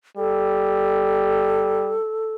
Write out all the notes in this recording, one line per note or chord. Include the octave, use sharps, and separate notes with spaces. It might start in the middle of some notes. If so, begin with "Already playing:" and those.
G3 A4